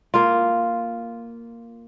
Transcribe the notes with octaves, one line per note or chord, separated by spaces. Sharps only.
A#3 F4